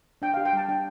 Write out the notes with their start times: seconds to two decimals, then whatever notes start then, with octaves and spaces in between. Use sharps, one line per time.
0.22 D4 G5
0.34 F5
0.37 G4
0.45 G5
0.53 G3 A5
0.68 D4 G5